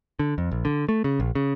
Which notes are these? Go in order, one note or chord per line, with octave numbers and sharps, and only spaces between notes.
D3
F2
A#1
D3
A3
C#3
A#1
C#3